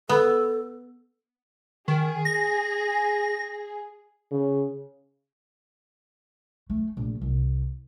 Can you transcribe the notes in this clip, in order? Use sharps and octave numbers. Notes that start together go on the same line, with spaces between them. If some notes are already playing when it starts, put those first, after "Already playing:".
B3 A4
D#3 G#4
A#6
C#3
A3
A#1
C2